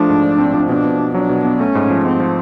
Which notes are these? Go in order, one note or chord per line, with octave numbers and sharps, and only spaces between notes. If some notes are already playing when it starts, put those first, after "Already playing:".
Already playing: F3 A3 D4
G#2
F3
C4
F3
B2 D4
B2
B2
F#3 D4
B2
B3
A3 C#4
G#2
F3
G#2 C4
F3